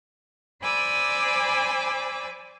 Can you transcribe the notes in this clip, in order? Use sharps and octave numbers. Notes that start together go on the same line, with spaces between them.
C5 D5 G#5 B5 D6 E6